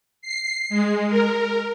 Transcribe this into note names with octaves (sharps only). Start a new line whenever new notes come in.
C7
G#3
A#4